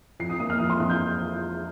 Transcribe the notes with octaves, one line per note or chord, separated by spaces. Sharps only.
F2 C7
D#6
A#3 D#6
F6
F2 D#6
C6
F2 F6
G6